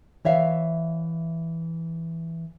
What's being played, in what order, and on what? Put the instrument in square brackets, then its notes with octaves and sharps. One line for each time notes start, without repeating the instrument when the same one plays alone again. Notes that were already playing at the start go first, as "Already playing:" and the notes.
[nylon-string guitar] E3 C#5 E5 F5